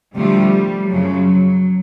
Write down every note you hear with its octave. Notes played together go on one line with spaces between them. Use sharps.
D2 C3 F3 G3 A3
F#2 C#3 F3 F#3